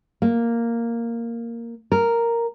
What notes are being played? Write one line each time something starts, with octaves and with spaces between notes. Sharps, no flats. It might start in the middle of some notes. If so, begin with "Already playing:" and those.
A#3
A#4